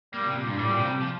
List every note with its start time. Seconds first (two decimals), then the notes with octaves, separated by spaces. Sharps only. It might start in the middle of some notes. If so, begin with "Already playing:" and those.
0.14 G3 A#3
0.25 C3
0.37 A#2
0.47 G2
0.59 A2 G3
0.70 A#2
0.80 C3
1.02 F3